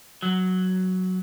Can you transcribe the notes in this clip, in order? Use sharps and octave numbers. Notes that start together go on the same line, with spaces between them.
F#3